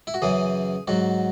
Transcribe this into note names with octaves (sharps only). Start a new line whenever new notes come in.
E4
F#4
F#2 C#3 E3 G#4
G#2 F#3 F#4